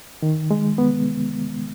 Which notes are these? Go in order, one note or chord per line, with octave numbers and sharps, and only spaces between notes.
D#3
G#3
B3